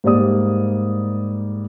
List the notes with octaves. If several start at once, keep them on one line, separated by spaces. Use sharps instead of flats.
G#2 G3 A#3 D5 D#6